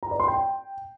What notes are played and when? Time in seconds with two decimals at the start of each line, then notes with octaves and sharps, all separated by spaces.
0.03 A#5
0.11 D5
0.20 C6
0.28 G5